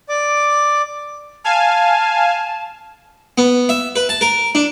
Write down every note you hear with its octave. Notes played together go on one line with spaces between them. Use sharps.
D5 D6
F5 G#5 A5
B3
E5
B4
A5
A#4
D4